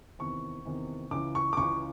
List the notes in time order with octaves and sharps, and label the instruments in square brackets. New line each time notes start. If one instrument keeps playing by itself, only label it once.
[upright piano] E2 C3 D#3 C#6
E2 C3 D#3
C#2 C#3 E3 D6
C#6
D6
C#2 C#3 E3 C#6